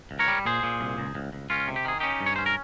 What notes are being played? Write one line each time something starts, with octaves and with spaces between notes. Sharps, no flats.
C#2
A#4 C#5
G3
A#2 G#4 C5
A#2
C2
C#2
C#2
C#2
C#2 C#4 F4
C3
G4
D#3 G#4
C#4 D#4 G4
G2
C#5
C#4 C5
A#4